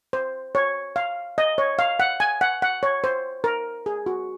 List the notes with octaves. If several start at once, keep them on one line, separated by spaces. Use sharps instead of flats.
C5
C#5
F5
D#5
C#5
F5
F#5
G#5
F#5
F#5
C#5
C5
A#4
G#4
F#4